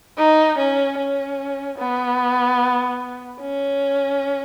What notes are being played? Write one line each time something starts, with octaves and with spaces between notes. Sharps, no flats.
D#4
C#4
C#4
B3
C#4